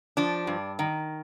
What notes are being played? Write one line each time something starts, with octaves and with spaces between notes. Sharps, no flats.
F3 D4
G2
D#3